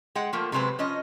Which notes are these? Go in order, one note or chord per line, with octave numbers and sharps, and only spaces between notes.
G#3 F#5 G5
F3 A3 A#3
C3 F#3 G#3 C4 B4
F3 C#4 D#5